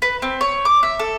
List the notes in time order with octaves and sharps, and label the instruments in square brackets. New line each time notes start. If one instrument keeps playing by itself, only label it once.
[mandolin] B4
C4
C#5
D6
E5
A4